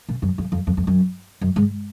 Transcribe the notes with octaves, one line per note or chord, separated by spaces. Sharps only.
A#2
F#2
F2
F2
F2
F2
F#2
F#2
G#2